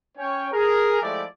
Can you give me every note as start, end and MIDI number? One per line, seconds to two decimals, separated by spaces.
0.18 0.47 61
0.18 0.47 73
0.18 0.47 79
0.53 1.01 68
0.53 1.01 70
1.01 1.23 53
1.01 1.23 56
1.01 1.23 57
1.01 1.23 64
1.01 1.23 67
1.01 1.23 74